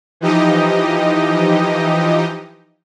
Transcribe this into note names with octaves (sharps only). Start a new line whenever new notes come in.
E3 F3 D#4 G4 D#5